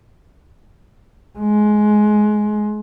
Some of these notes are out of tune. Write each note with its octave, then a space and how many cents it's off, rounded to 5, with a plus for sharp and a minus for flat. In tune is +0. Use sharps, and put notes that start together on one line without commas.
G#3 +20